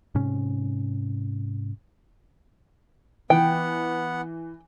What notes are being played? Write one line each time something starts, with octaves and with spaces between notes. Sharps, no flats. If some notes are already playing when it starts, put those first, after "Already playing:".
G#2 C3 C#4
E3 B3 F#5 G5